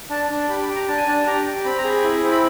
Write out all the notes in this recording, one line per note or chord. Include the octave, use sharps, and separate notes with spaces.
D4 A5
D4
G4 B5
B5
G4
A#5
D4 A5
G#5
D4 A5
G4 A#5
G4
C4 B5
A#5
G#4 B5
E4
C4
B5